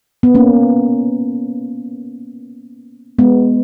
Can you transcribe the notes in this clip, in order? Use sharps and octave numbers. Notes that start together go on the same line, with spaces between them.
B3
A#3 C#4
G#3 B3